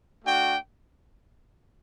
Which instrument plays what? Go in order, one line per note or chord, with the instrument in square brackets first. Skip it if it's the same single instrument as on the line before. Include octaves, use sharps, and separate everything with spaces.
[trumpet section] A3 D4 F#4 G5